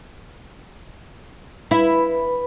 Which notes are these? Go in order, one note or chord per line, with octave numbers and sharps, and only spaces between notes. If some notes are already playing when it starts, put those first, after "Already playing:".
E4 B4 B5